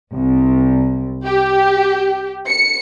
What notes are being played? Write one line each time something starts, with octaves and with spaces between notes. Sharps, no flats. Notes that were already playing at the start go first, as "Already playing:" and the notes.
C2
G4
C#7